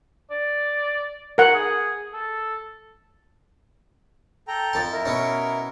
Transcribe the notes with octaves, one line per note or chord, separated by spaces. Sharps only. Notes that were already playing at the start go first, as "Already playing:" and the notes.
D5
A#4 F#5
G#4
A4
A4 G5 A#5
F2 A5
E4 A#4
B2 C#4